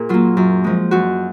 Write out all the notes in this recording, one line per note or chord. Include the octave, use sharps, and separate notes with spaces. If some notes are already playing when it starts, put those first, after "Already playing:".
Already playing: A#2 G#4 A#4
F#3 A#3 F4
F#2
F3 G#3
F#2 F#4